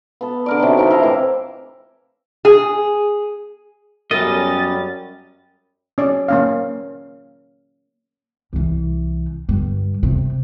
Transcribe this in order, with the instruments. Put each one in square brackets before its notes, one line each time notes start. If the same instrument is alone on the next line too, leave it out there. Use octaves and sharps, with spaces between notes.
[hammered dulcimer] B3 A4
D3 A#4 D5
C3 F#3 D#4
F3 D#4 G4
E4 C5 A#5
A2 E3 D6
[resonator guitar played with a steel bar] G#4
[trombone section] F#2 G3 [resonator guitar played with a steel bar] B3 A4 A#4 [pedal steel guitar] C#4 D#5 [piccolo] A6
[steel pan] C#4 D5
A#3 C#4 F5
[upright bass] C2 E3
G2 D3
C3